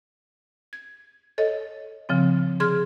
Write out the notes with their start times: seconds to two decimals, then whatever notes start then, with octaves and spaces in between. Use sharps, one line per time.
0.73 G#6
1.38 A4 C#5 D#5
2.09 C#3 F3 C4
2.60 D3 G#4 C6 F6 G#6